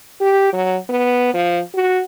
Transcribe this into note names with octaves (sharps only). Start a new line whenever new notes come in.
G4
F#3
B3
F3
F#4